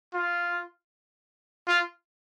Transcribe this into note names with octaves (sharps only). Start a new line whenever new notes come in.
F4
F4